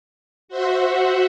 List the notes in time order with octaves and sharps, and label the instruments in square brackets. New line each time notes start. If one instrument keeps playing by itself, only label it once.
[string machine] F#4 C5 E5 F#5